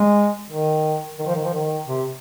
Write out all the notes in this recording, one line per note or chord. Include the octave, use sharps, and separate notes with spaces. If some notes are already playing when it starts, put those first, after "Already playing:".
Already playing: G#3
D#3
D#3
F3
D#3
F3
D#3
C3